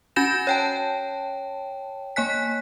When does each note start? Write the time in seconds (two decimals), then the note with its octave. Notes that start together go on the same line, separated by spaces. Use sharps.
0.16 C#4 F#4 G#5 G6 A#6 E7
0.47 C#5 G5 A5
2.16 A#3 C#5 G#5 F#6 B6